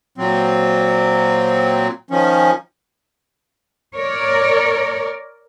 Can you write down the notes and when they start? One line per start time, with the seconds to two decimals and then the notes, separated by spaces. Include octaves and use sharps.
0.18 A#2 F#3 C4
2.11 D#3 F3 C#4
3.94 A#4 C#5 D5